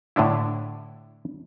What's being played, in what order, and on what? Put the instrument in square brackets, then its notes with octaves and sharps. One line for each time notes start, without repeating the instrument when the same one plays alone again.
[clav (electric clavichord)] A2 D3 D4 E4